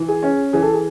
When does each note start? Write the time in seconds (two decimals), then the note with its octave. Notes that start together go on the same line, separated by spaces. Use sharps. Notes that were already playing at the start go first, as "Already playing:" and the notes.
Already playing: E3
0.08 G#4
0.23 C#4
0.53 E3 G#4
0.62 A4
0.73 G#4